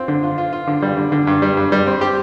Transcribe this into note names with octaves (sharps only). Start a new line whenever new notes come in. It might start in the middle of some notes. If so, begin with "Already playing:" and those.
Already playing: C4 F4
D3
F4
F4
F4
D3
G3
D3
D3
G2
G3
G2
G3
C4
G4